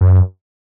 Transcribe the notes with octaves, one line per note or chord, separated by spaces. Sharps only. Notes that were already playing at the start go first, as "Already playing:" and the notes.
F#2